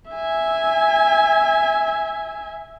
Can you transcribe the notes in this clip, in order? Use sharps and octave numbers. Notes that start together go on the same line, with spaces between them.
E5 G#5